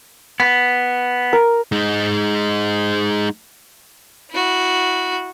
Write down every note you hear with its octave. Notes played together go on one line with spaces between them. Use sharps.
B3
A#4
G#3 D#4
E4 F#4